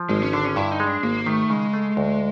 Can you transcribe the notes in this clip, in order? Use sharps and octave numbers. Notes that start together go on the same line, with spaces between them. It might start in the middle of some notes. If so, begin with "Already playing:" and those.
Already playing: F3
G#1 G#3
C#4
D3 D4
C#4
G2 E4
D#4
G#3
D4
G#1 A#3
D#3 A3
C#3 G#3
A3
D2